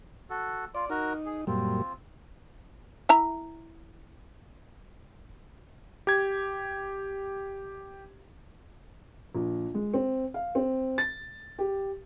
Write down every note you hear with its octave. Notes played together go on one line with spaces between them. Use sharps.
F#4 A4
F4 D5
D#4 F#4 A#4
G#4
F#2 A#2 G3 C4 F4
E4 E5 A#5
G4 G#6
A#1
G#3
C4
F5
C4
A6
G4